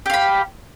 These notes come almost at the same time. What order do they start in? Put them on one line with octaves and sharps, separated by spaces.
G4 F5 B5